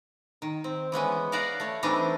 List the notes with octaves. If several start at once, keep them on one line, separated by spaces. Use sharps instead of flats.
D#3
C4
E3 G#3 B3 C#4
A#4 B4 D5 F5 F#5 A#5
A3 C#5
E3 G3 A3 C4 D4 D#4